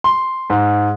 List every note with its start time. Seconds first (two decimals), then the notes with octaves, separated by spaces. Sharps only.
0.04 C6
0.50 G#2